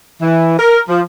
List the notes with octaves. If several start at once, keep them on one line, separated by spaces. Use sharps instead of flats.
E3
A#4
F3